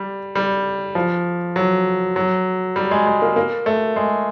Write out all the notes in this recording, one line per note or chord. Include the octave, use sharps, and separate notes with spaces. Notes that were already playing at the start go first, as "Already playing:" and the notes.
Already playing: G3
G3
F3
F#3
F#3
G3
G#3
G#3
A#3
A#3
A3
G#3